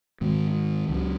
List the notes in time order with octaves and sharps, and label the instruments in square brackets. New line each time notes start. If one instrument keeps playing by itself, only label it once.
[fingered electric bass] G#2 D#3 G#3 C4
C#2 C#3 F#3